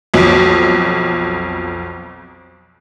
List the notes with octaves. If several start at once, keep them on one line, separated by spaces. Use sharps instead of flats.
B1 F2